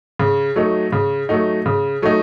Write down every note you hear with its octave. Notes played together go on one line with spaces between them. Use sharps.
C#3
F#3 A3 D#4
C#3
F#3 A3 D#4
C#3
F#3 A3 D#4